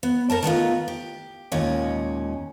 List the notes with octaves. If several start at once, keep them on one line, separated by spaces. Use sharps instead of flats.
B3
A4 A#4 D5 A5
D#3 A3 B3 F4
G4
D#2 A#2 G#3 C#4